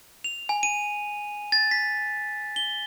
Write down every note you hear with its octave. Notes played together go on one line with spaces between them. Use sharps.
F7
G#5
D#7
A6
B6
G7